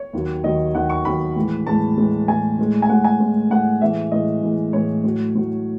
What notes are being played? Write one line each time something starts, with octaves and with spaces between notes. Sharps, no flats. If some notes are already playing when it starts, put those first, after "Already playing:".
Already playing: C#5
D#2 D#3 F#3
D#2 D#3 F#3 D#5
D#2 D#3 F#3 F#5
C#6
D#2 D#3 F#3 B5
A2 E3 G#3
A2 E3 G#3 A5
A2 E3 G#3
A2 E3 G#3 G#5
A2 G#3
G#5
A2 G#3 F#5
G#5
A2 G#3
A2 G#3 F#5
A2 E3 G#3 E5
A2 E3 G#3 D#5
A2 E3 G#3
A2 E3 G#3 C#5
A2 F#3
A2 F#3